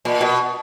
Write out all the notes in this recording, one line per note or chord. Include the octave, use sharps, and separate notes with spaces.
A#2
B2